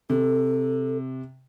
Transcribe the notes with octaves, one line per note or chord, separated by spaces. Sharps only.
C3 A4